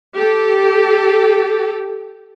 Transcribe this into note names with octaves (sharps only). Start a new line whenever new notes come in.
G4 A4